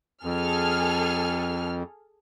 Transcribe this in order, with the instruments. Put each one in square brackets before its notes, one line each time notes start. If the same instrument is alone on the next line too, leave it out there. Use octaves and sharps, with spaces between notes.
[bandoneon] F2 [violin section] G#4 A4 F6